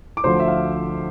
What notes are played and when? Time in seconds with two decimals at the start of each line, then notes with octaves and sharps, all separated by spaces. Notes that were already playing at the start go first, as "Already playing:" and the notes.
0.17 D6
0.24 D2 D3 F3 C5 C6
0.40 E5
0.48 F5